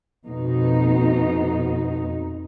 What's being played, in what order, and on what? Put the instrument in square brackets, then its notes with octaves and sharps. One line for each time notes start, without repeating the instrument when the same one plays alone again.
[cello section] F2 B2 D#4